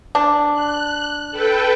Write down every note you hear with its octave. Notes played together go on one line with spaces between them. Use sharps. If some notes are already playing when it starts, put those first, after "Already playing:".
D4
F#6
A4 B4 G5